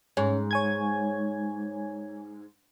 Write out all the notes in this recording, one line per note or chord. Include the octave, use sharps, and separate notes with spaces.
G#2 C#4
C#5 G#5 G#6